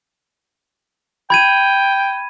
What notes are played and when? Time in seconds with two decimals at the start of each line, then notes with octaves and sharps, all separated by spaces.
1.30 G5 B5 G#6 D#7